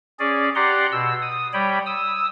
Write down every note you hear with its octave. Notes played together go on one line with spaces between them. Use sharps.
C#4 G#4 D5
G4 D5 F#5 A#5 C6
B2 E6
D#6
G3 C#5 G5 B5
D#6 E6